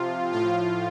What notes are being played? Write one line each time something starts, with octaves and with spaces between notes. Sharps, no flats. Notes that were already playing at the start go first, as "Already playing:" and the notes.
Already playing: C3 F3 F4
A2 F3 F4